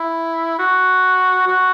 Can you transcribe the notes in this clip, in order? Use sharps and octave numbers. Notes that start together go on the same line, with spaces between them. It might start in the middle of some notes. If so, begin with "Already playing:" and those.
Already playing: E4
F#4
F#4